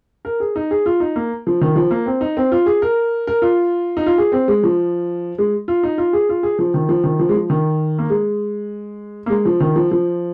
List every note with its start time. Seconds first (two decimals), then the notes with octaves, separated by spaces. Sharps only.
0.25 A#4
0.40 G#4
0.56 D#4
0.71 G#4
0.86 F4
1.00 D#4
1.16 A#3
1.47 F3
1.61 D#3
1.76 F3
1.91 A#3
2.06 C4
2.21 D#4
2.37 C4
2.52 F4
2.66 G#4
2.82 A#4
3.27 A#4
3.42 F4
3.97 D#4
4.06 F4
4.18 G#4
4.32 C4
4.48 G#3
4.63 F3
5.38 G#3
5.68 F4
5.83 D#4
5.98 F4
6.13 G#4
6.29 F4
6.43 G#4
6.59 F3
6.74 D#3
6.89 F3
7.04 D#3
7.19 F3
7.29 G#3
7.34 F3
7.50 D#3
7.99 A#3
8.10 G#3
9.26 A#3
9.30 G#3
9.45 F3
9.60 D#3
9.76 F3
9.91 F3